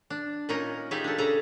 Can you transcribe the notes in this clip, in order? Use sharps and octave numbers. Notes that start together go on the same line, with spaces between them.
D4
A#2 C#4 D#4 A#4 D#5
D#4 F4 G4 G#4 E5
D4 A4
C#3 G#4 A4 A#5